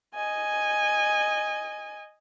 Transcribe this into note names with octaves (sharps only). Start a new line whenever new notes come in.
D#5 G#5